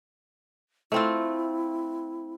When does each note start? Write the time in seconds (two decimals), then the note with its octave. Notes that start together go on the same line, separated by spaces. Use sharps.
0.92 A3 C4 E4 F4